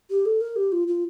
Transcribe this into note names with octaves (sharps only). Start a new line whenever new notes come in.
G4
A4
A#4
G4
F4
F4